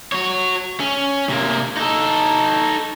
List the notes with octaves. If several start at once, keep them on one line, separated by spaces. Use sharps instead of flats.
F#4 C#5
C#4
C3 A#3
D#4 A4